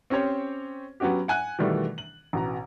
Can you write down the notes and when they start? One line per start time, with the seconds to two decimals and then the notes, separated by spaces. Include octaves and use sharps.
0.10 C4 C#4 G4 C5 C#5
1.00 F#3 B3 C#4 F#4 G4
1.28 F#5 G#5 F#6
1.58 B2 D#3 E3 G3 A3
1.98 F#7
2.33 A1 B2 A#5